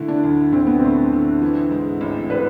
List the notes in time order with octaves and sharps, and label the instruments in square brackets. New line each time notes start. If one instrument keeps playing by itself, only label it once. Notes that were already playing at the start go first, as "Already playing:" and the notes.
Already playing: [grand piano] D3 A3 [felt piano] E4
[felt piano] D4
[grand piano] D2
[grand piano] D2 [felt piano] C4
[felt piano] B3
[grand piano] A3 [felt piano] C4
[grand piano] D3
E3
G#2
A1
[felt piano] B4